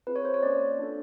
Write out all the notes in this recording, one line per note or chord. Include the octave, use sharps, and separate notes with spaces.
C4 F4 G#4 B4
C#5
C5
C#5
A#3 C#4 F4 D5
D4 F4 A4